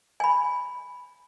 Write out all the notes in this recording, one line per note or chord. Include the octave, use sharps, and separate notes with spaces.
G#5 B5